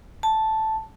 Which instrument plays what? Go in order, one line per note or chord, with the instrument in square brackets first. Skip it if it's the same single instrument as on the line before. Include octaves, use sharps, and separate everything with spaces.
[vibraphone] A5